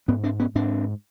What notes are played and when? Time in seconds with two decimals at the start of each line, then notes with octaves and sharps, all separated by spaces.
0.08 G#2 B3 C#4
0.24 C4 D4
0.40 B3 C#4
0.55 G#2 C4 D4